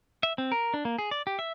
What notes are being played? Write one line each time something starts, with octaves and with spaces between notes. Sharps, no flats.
E5
C4
A#4
D4
A#3
G#4
D5
G4
E5